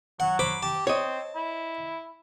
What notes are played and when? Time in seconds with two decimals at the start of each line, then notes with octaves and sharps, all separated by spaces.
0.20 F#3 F#5
0.39 C5 B5 D6
0.63 G4 A5
0.87 C4 C#5 D#5
1.36 E4